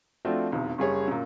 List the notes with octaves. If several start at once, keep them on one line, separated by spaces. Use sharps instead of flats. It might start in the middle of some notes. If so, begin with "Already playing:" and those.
F3 A3 C4 D4 F4 F#4
F1 B1 E2
F#1 G3 G#4 C#5
F#2 A#2